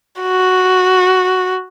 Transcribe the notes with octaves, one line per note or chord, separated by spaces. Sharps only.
F#4